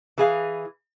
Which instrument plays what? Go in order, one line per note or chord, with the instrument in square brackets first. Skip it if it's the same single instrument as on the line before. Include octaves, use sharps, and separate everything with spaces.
[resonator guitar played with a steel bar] E3 G#4 F5